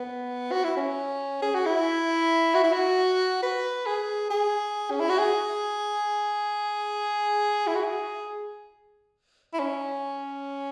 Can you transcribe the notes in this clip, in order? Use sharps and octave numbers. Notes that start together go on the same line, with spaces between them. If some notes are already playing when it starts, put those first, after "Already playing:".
Already playing: B3
F#4
E4
C#4
G#4
F#4
E4
F#4
E4
F#4
B4
G#4
G#4
C#4
E4
F#4
G#4
E4
F#4
G#4
E4
C#4